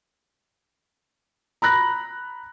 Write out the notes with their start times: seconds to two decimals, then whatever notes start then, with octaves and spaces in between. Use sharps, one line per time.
1.62 A#5 B5 F#6 A#6